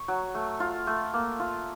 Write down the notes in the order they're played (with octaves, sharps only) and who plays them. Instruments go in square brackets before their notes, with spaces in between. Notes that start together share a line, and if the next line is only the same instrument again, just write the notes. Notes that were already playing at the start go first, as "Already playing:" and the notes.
Already playing: [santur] C#6
F#3
A3
F4
A3
A#3
F4